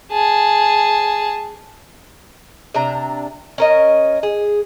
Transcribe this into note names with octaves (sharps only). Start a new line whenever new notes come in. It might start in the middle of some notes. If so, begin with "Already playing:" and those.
G#4 A5
C3 D4 A#5
C#4 A#4 D#5
G#4